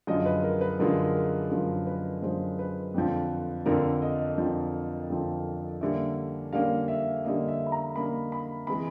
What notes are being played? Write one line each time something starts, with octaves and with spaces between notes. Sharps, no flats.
F#2 D3 F3 G#3 D#5
B4
A#4
B4
F#2 D3 F3 G#3 A#4
A#4
A#4
F#2 D3 F3 G#3 A#4
B4
F#2 D3 F3 G#3 C5
B4
F2 D3 F3
F2 D3 F3 A#4
D#5
F2 D3 F3
F2 D3 F3
D3 G3 A#3 C#4 E5
D3 G3 A#3 C#4 F5
E5
D3 G3 A#3 C#4 D#5
E5
B5
A#5
D3 G3 A#3 C#4 B5
B5
C3 E3 G#3 B5